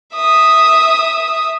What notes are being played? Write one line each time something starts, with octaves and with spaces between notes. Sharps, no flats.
E5 D#6